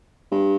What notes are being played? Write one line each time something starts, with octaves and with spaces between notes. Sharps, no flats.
G2